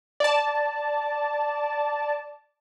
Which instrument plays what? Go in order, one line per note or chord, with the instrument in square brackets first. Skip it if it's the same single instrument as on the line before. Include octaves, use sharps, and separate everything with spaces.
[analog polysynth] D5 A5